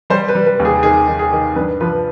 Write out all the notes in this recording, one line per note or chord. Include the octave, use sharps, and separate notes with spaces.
G3 C5
B4
G3
B4
D#2
G#4
D#3 G#4
D#3
G#4
D#3
G2 B4
F3 B4